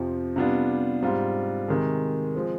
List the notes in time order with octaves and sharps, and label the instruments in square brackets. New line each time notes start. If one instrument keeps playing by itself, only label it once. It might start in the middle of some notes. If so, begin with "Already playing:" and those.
Already playing: [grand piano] F2 C3 F3
C3 G3 B3 D4 F4
G#2 G3 C4 F4
C3 D#3 G#3
F3 G#3 C4